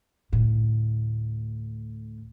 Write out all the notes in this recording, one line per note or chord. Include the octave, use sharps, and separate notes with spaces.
D2 A2